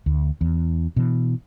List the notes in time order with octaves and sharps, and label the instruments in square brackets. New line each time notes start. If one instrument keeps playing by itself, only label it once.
[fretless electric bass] D2
E2
B2 E3